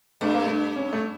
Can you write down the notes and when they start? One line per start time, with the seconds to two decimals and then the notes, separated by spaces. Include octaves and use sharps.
0.21 G2 A3
0.34 A#3
0.46 A3
0.76 C#4
0.93 A3